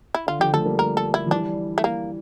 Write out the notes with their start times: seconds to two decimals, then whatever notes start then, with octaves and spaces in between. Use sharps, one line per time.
0.15 E4
0.27 D3 F4
0.39 D3 F3 G4
0.53 F3 A3 A4
0.66 G3 A#3
0.79 A#4
0.97 A4
1.14 E4
1.27 F3
1.31 E3 G3 D4
1.78 A3
1.84 A#3